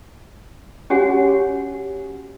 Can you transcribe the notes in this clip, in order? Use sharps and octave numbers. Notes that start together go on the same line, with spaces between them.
C#4 F#4 G4 C#5 F#5 G#5